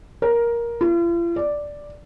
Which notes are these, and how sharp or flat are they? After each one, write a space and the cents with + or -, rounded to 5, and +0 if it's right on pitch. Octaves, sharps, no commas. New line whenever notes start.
A#4 +10
F4 -45
D5 +0